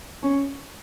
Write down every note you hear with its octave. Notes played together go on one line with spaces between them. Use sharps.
C#4